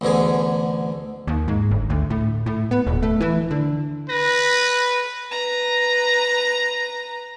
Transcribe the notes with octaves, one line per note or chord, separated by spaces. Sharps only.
A1 D2 B2 D3 G#4
D#2
G#2
G1
D2
A2
A2
B3
D#1
A3
E3
D3
B4 A#6
B4 A#5